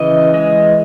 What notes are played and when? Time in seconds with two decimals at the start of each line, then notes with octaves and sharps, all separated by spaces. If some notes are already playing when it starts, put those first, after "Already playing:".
Already playing: C#3 E3 D#5
0.34 G#3 D#5